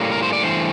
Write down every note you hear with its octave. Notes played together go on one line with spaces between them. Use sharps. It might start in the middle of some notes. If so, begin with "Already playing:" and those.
Already playing: A2 G3 A#3
A#4
C5
D5
G2 E3 A3 C5